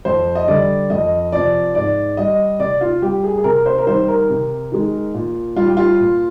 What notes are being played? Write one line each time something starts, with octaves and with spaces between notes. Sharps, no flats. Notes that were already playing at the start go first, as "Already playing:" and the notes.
F2 C5
D#5
D3 G3 D5
F2 D#5
C3 F3 D5
G#2 D5
G3 D#5
C3 D5
F4
G3 G4
G#4
G#4
C3 A#4
C5
A#4
D#3 G3 C5
A#4
C3
D#3 G#3
A#2
G3 F4
G4
F4
A#2